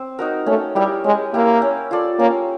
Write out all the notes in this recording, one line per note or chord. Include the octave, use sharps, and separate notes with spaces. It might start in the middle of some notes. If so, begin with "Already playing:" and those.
Already playing: C4
D#4 F#4 A#4
A3 C#4
G3 E4 G4 A#4
G#3 C#4
A#3 E4 G4 A#4
C#4
F4 A4 D5
A#3 C#4